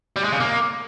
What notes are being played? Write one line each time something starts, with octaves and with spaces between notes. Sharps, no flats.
G3
G#3
C#3
A#3